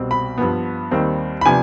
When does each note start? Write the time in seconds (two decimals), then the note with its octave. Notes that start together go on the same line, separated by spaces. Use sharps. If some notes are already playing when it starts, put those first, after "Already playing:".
Already playing: C2 B2 G3 C4
0.11 B5
0.38 G2 F3 B3
0.91 D#2 D#3 G3 C4
1.41 B5
1.46 C3 F3 B3 D4 G#5